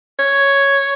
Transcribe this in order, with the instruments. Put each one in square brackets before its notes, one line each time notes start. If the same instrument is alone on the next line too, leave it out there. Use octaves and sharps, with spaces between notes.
[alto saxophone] C#5